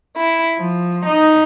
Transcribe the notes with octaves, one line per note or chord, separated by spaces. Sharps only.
E4
F3
D#4